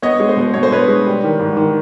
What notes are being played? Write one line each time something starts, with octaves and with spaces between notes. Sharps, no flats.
B3 C#5 D#5
G#3
C5
B2
B2 C#5
C5
B2 B4 C#5
G#3
G3
D#3
G#2
D#3